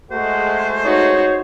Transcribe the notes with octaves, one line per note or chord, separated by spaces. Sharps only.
G#3 A3 F#4 C5
D#4 F#4 C#5